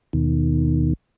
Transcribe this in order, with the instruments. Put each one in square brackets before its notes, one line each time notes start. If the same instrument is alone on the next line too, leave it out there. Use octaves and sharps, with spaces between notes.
[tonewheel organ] D#2 B2 D#3